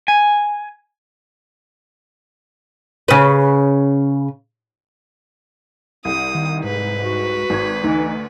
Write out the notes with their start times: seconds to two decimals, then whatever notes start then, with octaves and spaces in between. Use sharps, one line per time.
0.08 G#5
3.08 C#3 B4
6.05 C2 G3 D#6
6.35 D#3
6.64 G#2 B4
7.04 F#4
7.50 G#1 G#6
7.84 D2 E3 D#4